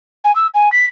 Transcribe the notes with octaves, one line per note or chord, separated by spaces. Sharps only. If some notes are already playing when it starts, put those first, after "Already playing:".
G#5
E6
G#5
B6